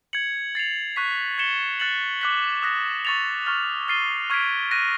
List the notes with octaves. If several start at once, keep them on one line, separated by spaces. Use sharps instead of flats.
G#6 C#7 F#7
A6 C7 F7
C#6 F#6 B6
G#6 C#7 E7 G7
F#6 A6 C#7 F#7
D6 F#6 B6
D#6 F#6 A#6
C#6 E6 A6 C#7 F7
C#6 F6 A6
F6 A6 C7 D#7 G7
C#6 F6 G#6 B6 D7
F#6 A#6 D#7